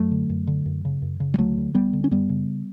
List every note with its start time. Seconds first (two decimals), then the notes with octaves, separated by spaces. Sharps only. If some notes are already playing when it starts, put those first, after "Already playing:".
Already playing: F#2 F#3 A3
0.11 D3
0.29 F#2
0.47 D3
0.66 F#2
0.85 C#3
1.02 F#2
1.20 C#3
1.34 G3
1.38 D2 F#3 A3
1.58 D3
1.75 D2 G3 B3
1.93 D3
2.04 C#4
2.11 F#2 G3 B3
2.29 C#3